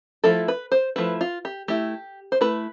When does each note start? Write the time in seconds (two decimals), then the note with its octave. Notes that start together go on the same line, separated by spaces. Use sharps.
0.24 F3 A3 E4 A4
0.48 B4
0.72 C5
0.96 F3 A3 E4 B4
1.21 F4
1.45 G4
1.68 A3 E4 G4
2.32 C5
2.41 A3 E4 B4